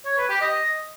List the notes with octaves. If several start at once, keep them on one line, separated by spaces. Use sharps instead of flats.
C#5
B4
G4
D#5